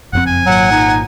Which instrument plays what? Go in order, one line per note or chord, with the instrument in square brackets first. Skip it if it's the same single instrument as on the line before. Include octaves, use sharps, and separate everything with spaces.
[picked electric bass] F#1 F2 C4 [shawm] F#5
[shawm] G#5
[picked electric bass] G#1 A#2 [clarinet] F#3 [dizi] F#5
[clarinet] D#4